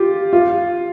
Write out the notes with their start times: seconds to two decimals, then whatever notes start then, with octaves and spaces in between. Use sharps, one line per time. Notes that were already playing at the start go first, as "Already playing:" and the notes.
Already playing: F4 G4
0.33 F4